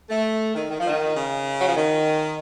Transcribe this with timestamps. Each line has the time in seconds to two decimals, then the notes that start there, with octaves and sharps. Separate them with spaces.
0.10 A3
0.54 D#3
0.69 D#3
0.79 F3
0.87 D#3
1.14 C#3
1.60 F#3
1.68 F3
1.75 D#3